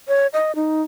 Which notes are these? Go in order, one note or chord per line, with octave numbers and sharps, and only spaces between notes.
C#5
D#5
D#4